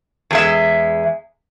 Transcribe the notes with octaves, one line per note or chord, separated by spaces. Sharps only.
E2 G#3 E5